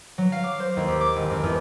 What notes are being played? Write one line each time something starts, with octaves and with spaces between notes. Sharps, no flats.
F#3
F5
D6
C5
D#2
G4
D6
G#1
F2
E2